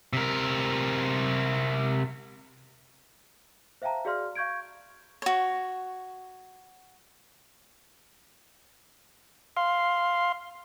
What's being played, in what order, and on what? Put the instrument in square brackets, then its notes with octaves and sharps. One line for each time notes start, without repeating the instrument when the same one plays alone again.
[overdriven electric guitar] C3 A#4
[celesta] C5 E5 F5 G5 A5 A#5
F#4 G#4 D5 F5 C6 F6
F5 C#6 G6 G#6 D7
[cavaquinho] F#4 C#5
[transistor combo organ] F5 C6